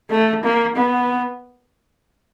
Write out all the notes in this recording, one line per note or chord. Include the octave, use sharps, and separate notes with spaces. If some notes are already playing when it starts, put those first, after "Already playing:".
A3
A#3
B3